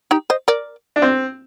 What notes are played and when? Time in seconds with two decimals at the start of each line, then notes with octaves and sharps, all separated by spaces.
0.11 D#4 G4
0.30 C5 D#5
0.48 A#4 D5
0.96 D4
1.02 C4